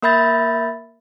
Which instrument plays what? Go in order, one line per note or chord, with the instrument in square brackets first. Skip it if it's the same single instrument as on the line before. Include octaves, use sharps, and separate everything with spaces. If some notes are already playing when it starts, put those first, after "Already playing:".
[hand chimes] A#3 A#4 E5 B5 G6 A6